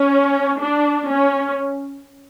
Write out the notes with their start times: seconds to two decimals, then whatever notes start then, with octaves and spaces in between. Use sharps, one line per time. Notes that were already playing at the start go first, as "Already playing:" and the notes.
Already playing: C#4
0.60 D4
1.09 C#4